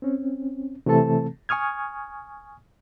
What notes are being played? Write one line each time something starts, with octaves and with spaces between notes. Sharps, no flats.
C4 C#4
C3 E3 A3 C4 A4 A5
G#5 C#6 D#6 F6 G#6